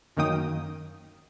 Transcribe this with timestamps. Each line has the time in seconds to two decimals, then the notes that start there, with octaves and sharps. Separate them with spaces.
0.17 F#2 D#3 A#3 D#4 G5 D#6